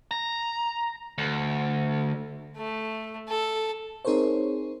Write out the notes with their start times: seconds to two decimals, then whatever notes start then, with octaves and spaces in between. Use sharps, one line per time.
0.11 A#5
1.18 D2
2.56 A3
3.28 A4
4.05 C4 D#4 G#4 A#4 C5 C#5